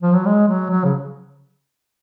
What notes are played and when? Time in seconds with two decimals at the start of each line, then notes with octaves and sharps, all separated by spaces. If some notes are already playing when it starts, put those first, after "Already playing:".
0.02 F3
0.14 F#3
0.26 G#3
0.48 F#3
0.70 F#3
0.84 C#3